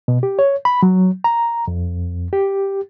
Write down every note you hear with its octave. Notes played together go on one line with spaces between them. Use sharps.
B2
G4
C#5
B5
F#3
A#5
F2
G4